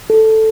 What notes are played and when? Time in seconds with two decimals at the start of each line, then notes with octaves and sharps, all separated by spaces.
0.10 A4